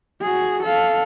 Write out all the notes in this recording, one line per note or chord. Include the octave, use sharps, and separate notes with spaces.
F#4 G#4
A4 F5